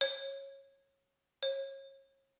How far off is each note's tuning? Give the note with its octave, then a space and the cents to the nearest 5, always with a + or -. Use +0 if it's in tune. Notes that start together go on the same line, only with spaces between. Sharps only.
C#5 -20
C#5 -35